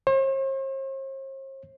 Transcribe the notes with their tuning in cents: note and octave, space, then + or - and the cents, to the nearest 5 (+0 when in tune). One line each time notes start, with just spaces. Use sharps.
C5 +45